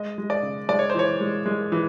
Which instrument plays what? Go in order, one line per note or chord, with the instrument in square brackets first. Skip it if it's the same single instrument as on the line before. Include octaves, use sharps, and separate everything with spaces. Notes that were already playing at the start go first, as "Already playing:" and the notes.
Already playing: [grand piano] G#3 D#5
G#3
D5
C#3
G#3 D5
C#5
C5
E3 C#5
G#3
G#3
E3